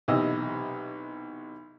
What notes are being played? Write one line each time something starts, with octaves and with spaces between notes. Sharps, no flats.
B1 C3 E3 D#5 E6